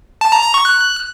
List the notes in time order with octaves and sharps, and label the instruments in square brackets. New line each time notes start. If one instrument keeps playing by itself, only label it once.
[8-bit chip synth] A5
A#5
A#5
C#6
F#6